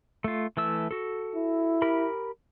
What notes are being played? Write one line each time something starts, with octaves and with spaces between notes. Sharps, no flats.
A3 F4
E3 A3 E6
F#4 A4
E4
G4 A#4 B5